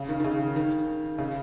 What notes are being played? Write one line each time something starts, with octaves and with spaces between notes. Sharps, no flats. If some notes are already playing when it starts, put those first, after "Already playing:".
Already playing: C#3
D#3
D#3
C#3
D#3
C#3